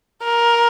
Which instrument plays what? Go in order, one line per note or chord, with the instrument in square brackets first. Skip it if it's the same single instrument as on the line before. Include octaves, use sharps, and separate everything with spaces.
[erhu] A#4